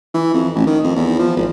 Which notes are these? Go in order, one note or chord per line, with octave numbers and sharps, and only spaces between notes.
E3
F2
A1
D#3
F2
E2
F3
G#1